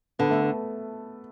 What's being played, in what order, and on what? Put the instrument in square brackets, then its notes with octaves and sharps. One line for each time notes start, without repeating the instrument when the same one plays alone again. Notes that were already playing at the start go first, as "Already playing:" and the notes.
[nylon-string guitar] D3 [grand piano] B3
[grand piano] A3
B3